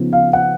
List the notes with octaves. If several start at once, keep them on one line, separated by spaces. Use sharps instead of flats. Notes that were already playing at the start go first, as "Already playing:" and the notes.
Already playing: C#3 F3 B3 D#4
F5
F#5